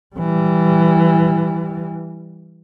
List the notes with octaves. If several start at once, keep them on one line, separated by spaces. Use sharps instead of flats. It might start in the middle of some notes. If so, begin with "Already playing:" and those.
E3 G3